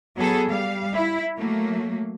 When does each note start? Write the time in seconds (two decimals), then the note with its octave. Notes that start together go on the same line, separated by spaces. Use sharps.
0.17 F#3 B3 G#4 A4
0.48 G3 F5
0.95 E4
1.35 F#3 A3 A#3